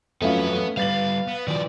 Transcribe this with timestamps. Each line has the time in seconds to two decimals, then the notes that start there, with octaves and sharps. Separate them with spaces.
0.22 F2 F#3 A3 B3 C#4 F4 B4
0.77 G3 B3 B4 F5 A6 F#7
1.28 B3
1.48 D#3 F3 D5